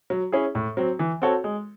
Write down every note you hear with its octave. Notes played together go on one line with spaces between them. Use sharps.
F#3
C#4 E4 G#4
A2
F#3 C4
E3
C4 F#4 A4 C#5
G#3